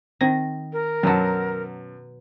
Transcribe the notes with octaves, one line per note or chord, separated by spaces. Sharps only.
D#3 C4 A#6
A#4
F#2 B2 F#3 A5